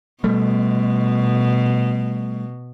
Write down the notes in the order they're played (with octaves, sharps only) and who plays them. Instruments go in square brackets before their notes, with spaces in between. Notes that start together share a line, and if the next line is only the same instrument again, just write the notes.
[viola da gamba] B2 [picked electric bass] G3 A3